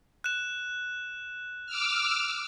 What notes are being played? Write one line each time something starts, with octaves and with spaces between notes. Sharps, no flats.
F#6 E7
D6 E6 F6